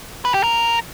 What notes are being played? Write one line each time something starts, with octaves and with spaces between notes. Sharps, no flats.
B4
G4
A#4